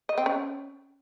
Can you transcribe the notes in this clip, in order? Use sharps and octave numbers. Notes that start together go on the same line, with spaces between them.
D#5
C4
C#4